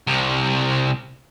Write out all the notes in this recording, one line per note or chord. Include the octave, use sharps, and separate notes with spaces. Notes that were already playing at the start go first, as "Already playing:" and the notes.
C2 C3